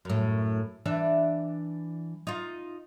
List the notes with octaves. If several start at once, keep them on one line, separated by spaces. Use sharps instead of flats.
F#2 A2
E3 D4 E5
D#4 F4